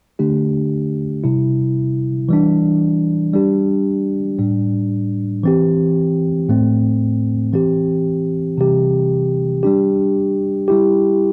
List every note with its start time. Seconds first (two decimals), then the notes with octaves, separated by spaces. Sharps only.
0.19 D3 A3 D4 G4
1.24 C3 G3 E4
2.29 E3 G3 D4
3.33 G3 D4 G4
4.38 A2 G3 D4
5.43 E3 C4 G4
6.48 A2 A3 C4
7.53 E3 C4 G4
8.58 C3 E3 G3 C4 G4
9.63 G3 D4 G4
10.68 G3 E4 G4